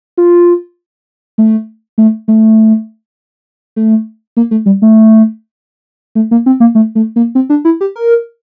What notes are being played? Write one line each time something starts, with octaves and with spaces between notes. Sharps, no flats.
F4
A3
A3
A3
A3
A#3
A3
G3
A3
A3
A#3
C4
A#3
A3
A3
A#3
C4
D4
E4
G4
A#4